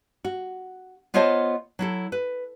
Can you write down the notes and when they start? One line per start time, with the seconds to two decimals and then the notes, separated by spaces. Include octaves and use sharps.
0.25 F#4
1.14 B3 F4 C5 C#5 D#5 A5
1.79 F#3 E4 A4
2.12 B4